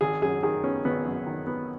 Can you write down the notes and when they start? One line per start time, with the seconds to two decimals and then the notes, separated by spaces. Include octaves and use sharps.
0.01 G#1 G#4
0.22 F#2 G#4
0.43 D#3 G#4
0.64 B3 C#4
0.85 G#1 B3
1.05 F#2
1.27 D#3
1.47 B3